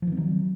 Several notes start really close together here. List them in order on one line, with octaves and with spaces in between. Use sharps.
F3 D#3 C4 F#3